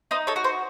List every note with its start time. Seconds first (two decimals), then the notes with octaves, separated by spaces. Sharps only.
0.11 D#4 C5 D#5
0.27 A4 C#5
0.36 F#4
0.44 C5